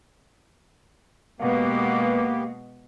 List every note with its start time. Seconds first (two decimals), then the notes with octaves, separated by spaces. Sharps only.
1.40 B2 G#3 A#3 B3 G4